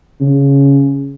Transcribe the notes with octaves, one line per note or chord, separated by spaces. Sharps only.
C#3